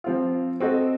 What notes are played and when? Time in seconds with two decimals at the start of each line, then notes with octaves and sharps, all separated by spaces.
0.04 F3 C4 F4
0.60 C4 F#4 A4 D#5